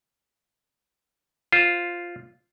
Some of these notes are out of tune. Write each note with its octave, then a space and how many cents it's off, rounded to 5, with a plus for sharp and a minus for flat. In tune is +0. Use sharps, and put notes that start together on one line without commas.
F4 +0 C5 +0